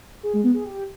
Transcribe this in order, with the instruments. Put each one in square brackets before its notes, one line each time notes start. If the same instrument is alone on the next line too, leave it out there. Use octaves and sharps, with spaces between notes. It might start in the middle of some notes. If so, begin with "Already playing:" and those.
[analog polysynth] G#4
G#3
B3
G#4
G4